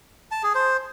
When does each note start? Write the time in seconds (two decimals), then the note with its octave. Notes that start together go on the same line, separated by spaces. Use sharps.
0.32 A5
0.43 G#4
0.55 C5